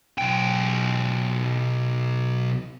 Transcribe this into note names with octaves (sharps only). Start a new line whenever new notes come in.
B1 G5